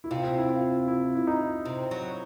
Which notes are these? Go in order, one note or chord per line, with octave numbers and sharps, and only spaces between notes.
E4
C3 F4
E4
F4
E4
E4
D#4
C3
F#3